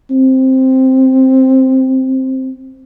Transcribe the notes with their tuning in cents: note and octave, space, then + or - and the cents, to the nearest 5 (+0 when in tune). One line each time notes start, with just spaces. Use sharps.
C4 +5